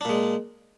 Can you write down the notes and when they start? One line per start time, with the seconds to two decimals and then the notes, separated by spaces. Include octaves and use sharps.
0.01 D4
0.05 A#2
0.09 G#3